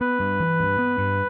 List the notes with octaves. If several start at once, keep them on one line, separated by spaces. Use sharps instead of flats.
B3 B4
G2
E3
G2
B3
G2